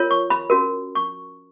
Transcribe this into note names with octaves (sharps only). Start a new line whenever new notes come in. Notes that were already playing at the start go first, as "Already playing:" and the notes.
Already playing: F4 A#4 C#5
C#6
B5
C#4 F#4 A#4
C#6